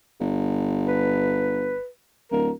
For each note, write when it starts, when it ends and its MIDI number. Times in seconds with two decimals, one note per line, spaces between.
0.21 1.76 31
0.88 1.87 71
2.31 2.50 26
2.31 2.51 70